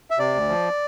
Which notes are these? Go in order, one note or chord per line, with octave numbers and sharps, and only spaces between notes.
E5
C3 D5
D2
F3